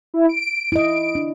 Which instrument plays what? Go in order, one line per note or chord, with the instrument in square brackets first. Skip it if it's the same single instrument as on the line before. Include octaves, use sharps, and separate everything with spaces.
[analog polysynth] E4
D7
[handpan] E4 D#5
D4